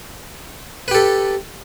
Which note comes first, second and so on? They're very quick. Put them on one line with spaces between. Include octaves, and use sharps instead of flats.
B4 G4 A4